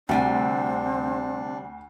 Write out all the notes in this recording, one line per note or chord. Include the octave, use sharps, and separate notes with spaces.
D2 C3 G3 C4 D4 G#5